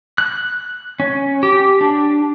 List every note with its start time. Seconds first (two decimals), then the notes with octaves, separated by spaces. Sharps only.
0.18 F#6
1.00 C#4
1.43 G4
1.81 D4